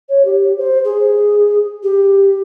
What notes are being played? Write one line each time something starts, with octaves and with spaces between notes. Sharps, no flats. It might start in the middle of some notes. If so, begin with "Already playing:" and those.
C#5
G4
C5
G#4
G4